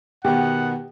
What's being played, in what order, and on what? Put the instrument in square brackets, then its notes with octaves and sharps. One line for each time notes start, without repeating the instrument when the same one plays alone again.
[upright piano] B2 D#3 B3 [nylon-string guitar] G4 [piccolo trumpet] F#5